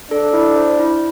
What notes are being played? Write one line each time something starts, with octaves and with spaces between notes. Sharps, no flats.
D4 A4
E4
C5
E4